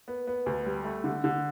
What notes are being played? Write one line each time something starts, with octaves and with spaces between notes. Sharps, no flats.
B3
B3
D2
G3
A3
D3
D3